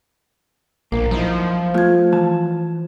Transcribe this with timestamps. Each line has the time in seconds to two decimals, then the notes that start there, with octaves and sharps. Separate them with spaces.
0.92 A#1 A#3
1.11 F#2 F3 D#4 E4
1.74 A3 F4 G#6
2.12 E3 A5